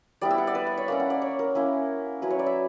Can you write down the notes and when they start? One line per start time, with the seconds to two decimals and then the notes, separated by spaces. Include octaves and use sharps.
0.21 G3 B3 E4 D5
0.31 E5
0.38 F#5
0.47 D5
0.55 B4
0.67 E5
0.78 C#5
0.88 A#3 C#4 E4 D5
1.00 F#5
1.10 D5
1.22 C#5
1.39 A#4
1.55 A#3 C#4 E4
2.22 F#3 C#4 E4 B4
2.31 C#5
2.39 D5
2.46 E5